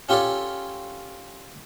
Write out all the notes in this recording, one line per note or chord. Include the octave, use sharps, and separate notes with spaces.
C#4 F4 G4 A4 C#5 D5